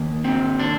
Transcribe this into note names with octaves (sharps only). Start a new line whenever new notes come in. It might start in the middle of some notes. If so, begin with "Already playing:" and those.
Already playing: D#3 A#3
C4
D4